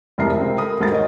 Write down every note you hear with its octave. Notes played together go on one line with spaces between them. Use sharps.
F1 C2 G#2 A#4 E5 C7
C#2 C3 C4
A4 A#4 B5 D#6
D#1 D2 G#2 A#3 A6
D#4 C#5 D#5